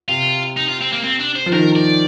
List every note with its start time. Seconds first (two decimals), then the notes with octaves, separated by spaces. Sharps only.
0.09 C3 F4
0.57 D#4
0.68 F4
0.81 C4
0.92 A#3
1.04 C4
1.20 D4
1.36 C5
1.46 F3
1.52 D#3 A#4
1.75 D5